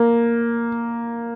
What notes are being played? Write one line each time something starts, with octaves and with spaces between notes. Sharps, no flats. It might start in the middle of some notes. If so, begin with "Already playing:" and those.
Already playing: A#3